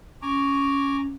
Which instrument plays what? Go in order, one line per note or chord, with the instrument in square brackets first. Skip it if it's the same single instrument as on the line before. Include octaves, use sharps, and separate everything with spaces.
[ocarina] C#4 [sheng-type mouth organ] G#5 A#5 D6 [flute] C#6